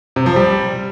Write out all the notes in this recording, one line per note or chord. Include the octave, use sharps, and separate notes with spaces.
C3
F3
G3